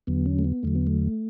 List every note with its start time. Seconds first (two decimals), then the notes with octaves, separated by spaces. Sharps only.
0.07 E2 D3 F#3 B3
0.26 C#4
0.39 A3
0.44 B3
0.63 E2 D3 F#3 A3
0.75 B3
0.87 A3